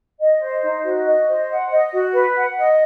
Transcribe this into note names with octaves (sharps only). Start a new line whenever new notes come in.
D#5
C5
D#4
F#4
D#5
C5
F#5
D#5
F#4
B4
F#5
D#5